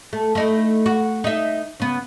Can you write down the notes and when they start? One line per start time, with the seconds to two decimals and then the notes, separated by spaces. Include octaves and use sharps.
0.13 A3
0.35 A3 D#4 E4
0.86 F#4
1.24 D#4 E5
1.80 C#3 B3